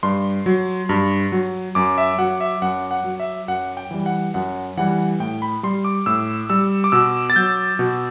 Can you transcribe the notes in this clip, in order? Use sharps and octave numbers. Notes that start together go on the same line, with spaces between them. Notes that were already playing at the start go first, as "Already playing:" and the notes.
G2 C6
F#3
G2
F#3
F#2 D6
E5
F#3 F#5
E5
F#2 F#5
F#5
F#3
E5
F#2 F#5
G5
E3 G3
F#5
F#2 F#5
E3 G3 F#5
A2 G5
B5
G3 C6
D6
A2 E6
G3 E6
D6
B2 E6
A6
F#3 G6
B2